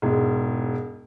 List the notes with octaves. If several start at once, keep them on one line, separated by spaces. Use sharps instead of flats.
E1 G#2